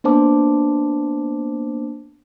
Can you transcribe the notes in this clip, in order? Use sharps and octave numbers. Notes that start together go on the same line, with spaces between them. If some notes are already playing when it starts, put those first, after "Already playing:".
A#3 B3 D4 C5 A5 D6